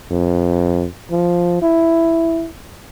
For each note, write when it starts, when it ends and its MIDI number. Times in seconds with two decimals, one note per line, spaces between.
0.11 0.86 41
1.11 1.59 53
1.62 2.47 64